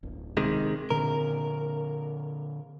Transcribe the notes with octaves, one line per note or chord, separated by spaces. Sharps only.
D1 G1
C3 D#3 G#3
A#2 D3 C4 A#4